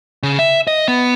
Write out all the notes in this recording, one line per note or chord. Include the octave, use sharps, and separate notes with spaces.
C#3
E5
D#5
B3